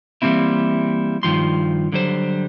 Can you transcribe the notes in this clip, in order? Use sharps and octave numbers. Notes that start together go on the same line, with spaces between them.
E3 F3 G3 A#3 C4 E4
G2 D#3 F3 C6
D3 F#3 G3 C5